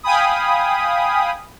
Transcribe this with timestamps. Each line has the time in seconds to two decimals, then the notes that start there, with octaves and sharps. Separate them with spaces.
0.03 F5 G5 G#5 B5 D#6